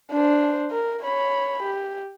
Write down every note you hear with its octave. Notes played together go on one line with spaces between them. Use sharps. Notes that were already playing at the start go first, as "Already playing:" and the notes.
D4 C5
A#4
C#5 B5
G4